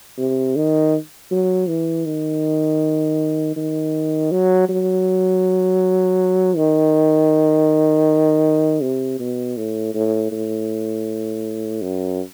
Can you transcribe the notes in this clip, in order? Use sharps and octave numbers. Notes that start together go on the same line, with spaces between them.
C3
D#3
F#3
E3
D#3
D#3
F#3
F#3
D#3
C3
B2
A2
A2
A2
F#2